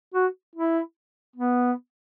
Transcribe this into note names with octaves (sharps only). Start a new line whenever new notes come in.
F#4
E4
B3